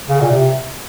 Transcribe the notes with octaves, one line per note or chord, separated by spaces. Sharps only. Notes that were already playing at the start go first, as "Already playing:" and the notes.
C#3
A#2
C3